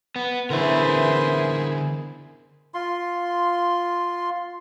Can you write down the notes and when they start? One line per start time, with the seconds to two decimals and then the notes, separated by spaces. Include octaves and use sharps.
0.16 B3
0.50 D3 E3 B3 E4 G#4 A#4 C5 E5
2.74 F4 C6